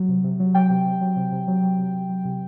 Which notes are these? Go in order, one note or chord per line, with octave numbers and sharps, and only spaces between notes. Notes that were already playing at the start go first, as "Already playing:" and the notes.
Already playing: F#3
C3
C3
F#3
F#3 G5
C3
C3
F#3
C3
C3
F#3
F#3
C3
C3
F#3
C3